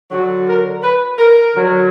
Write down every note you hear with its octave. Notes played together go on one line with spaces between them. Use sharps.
D3 F#3 F#4
A#4
B4
A#4
D3 F#3